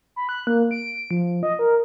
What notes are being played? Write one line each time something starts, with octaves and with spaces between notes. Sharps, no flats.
B5
F#6
A#3
D7
F3
D#5
A#4